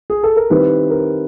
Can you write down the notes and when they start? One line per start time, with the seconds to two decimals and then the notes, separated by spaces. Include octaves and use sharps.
0.10 G#4
0.23 A4
0.36 A#4
0.50 D#3 G3 C4 E4 B4
0.90 A#4